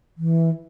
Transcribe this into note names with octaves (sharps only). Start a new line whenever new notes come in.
E3